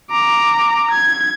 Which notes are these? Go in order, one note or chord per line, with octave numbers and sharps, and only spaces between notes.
A#5 D6
G#6